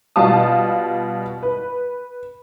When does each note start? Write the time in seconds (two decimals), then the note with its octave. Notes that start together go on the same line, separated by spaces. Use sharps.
0.16 B2 G3 F4 A5 D#6
1.43 B4